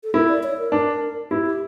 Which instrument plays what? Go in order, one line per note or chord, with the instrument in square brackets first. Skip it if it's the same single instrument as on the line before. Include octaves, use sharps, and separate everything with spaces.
[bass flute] A4
[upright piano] E4 [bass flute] A#4
[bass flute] D5
C#5
A#4
[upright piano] D4
[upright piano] E4 [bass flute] G4
[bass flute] G4